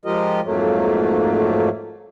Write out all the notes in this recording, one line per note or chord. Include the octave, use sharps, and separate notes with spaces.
F3 G#3 F4 G4 A#4 D#5
F2 G#2 F#3 A3 A#3